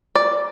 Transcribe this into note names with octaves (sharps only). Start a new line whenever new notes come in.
D5